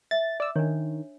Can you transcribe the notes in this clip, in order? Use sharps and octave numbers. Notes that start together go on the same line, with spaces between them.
E5 A6
D5 E6
D#3 D4 C#5